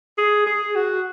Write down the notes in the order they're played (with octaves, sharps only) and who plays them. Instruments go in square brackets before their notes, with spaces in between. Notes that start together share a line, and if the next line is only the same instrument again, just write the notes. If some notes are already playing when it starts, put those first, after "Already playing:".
[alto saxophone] G#4
G#4
F#4